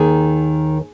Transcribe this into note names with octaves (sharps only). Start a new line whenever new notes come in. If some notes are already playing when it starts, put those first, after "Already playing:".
Already playing: D#2 D#3 G#4